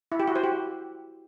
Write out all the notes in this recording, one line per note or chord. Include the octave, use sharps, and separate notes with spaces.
E4
G4
F#4
C5
G4